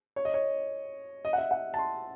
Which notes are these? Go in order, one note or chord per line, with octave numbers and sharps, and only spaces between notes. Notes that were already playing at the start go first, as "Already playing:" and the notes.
C#5
D#5
C#5
D#5
F#5
E5
F#5
A5
C6